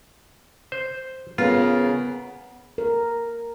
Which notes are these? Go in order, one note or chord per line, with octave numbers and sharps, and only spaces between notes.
C5
C#3 B3 F4 A#4
A#4